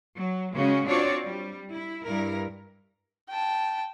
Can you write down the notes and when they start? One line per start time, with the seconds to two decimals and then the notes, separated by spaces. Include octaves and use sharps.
0.16 F#3
0.54 C#3 G#3 C#4 F#4
0.88 C4 D4 F4 F#4 C#5 D5
1.24 G3
1.72 E4
2.05 G2 E4 A#4
3.30 G5 A5